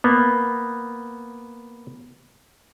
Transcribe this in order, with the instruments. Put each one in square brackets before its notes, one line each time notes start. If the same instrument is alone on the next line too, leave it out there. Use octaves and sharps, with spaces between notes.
[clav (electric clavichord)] A#3 B3